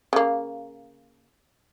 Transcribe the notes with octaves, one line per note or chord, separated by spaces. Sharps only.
C#3 A#3